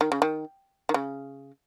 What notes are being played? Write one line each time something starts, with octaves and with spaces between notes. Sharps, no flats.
D#3
C#3
D#3
D#3
C#3